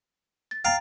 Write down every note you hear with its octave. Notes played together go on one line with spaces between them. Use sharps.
A6
F5 G5 A#5 A6